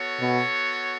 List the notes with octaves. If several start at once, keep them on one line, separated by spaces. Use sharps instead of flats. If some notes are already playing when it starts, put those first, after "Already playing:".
Already playing: B3 F#4 A4 C#5
B2